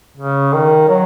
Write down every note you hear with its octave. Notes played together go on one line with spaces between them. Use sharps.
C#3
D#3
F#3